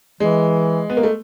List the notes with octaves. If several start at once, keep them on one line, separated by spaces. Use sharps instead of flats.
E3 G#3
B3
A#3
A3